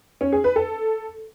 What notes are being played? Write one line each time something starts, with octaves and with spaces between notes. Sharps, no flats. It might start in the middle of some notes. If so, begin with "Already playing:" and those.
C#4
G#4
B4
A4